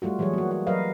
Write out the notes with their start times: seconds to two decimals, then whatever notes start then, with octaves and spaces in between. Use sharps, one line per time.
0.02 G3 A3 F4 F#4
0.19 E3 F#3 G3 G#4 C#5
0.34 A#3 F#4
0.51 F#4
0.67 F#3 A#4 B4 D#5 F5